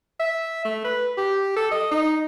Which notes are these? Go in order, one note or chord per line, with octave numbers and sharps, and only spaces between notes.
E5
A3
B4
G4
A4
D#5
D#4